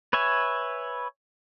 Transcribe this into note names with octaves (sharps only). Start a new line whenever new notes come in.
B4 C#5 E5 G#5